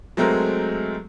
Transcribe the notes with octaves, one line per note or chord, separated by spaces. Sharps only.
F#3 G#3 A3 C4 A#4